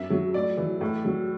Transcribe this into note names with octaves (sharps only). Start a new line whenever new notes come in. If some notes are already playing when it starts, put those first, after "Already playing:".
Already playing: F#2 E5
F#3
A2 D5
E3
A2
F#3